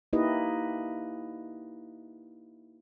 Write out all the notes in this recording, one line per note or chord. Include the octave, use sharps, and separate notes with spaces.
A#3 D#4 E4 G4 B4 D#5